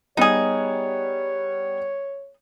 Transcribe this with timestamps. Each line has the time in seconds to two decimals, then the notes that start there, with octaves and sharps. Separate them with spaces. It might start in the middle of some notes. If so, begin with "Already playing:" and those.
0.17 G3 B3 D#4 G#4 C#5